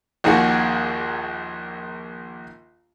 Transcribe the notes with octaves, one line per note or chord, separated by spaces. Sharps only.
A#1 D#2 D#3 F#4 G#4